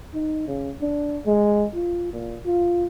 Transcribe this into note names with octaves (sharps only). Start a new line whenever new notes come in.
D#4
C#3
D4
G#3
F4
A#2
F4